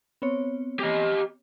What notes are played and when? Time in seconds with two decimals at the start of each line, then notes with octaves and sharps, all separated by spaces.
0.22 B3 C4 C#5
0.80 G4 D#5